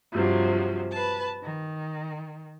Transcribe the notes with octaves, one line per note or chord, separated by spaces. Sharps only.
G2 C3 F3 F#3
B4 A5
D#3